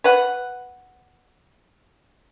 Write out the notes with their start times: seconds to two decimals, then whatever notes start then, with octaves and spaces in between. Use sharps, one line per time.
0.04 B4 F#5